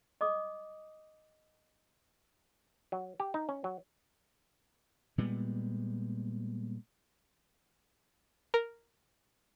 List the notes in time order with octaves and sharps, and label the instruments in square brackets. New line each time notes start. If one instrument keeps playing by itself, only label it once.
[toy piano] D#5 D6 D#6
[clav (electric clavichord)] F#3
G4
D#4
C#4
F#3
[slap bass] A#2 G3 G#3 B3
[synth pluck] A#4